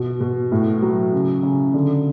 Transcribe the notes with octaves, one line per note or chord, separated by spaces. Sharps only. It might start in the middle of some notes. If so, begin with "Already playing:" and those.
Already playing: B2
B2
A2
F#3
C#3
C#3
D3